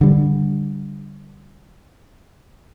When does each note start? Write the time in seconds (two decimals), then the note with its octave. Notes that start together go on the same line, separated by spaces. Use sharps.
0.01 D3 G3